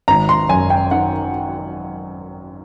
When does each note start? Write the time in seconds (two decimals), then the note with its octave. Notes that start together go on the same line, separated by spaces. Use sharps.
0.08 G#1 A#5
0.29 C6
0.49 F#2 G#5
0.70 G5
0.91 D#3 F#5